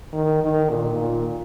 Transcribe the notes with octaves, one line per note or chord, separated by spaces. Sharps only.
D#3
D#3
A#2
A#2